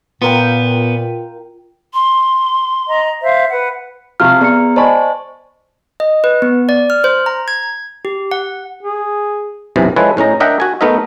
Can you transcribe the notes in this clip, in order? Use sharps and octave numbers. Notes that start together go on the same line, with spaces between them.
A#2 B3 F4 A#4 G5
C6
D#5 A#5
C5 E5 F5
B4 F#5
C3 F3 F5 C#6 F6
B3 G#4 D5 A#5 C#7
C5 D5 D#5 G#5 A5 B5 C#6
D#5
B4
B3
D5
F6
C5
A#5
G#6
G4
F#5
G#4
B1 F#2 C3 E3
F3 G#3 E4 A4 B4 C#5
A2 C#4 D#4 A#5
D4 A#4 D#5 E5 F#5 G5
F#4 G#5
A3 B3 D#4 A#4 E5